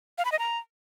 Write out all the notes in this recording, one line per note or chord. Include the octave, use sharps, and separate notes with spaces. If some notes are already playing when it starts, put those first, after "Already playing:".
F5
B5
D#5
A#5